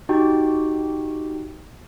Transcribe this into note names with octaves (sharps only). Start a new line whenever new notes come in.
D#4 F#4 G4 G5